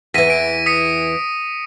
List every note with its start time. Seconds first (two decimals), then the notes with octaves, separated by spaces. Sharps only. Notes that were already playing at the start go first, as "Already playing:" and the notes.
0.14 E2 E3 A#6 B6 D#7
0.30 D7
0.66 D#6 B6 C#7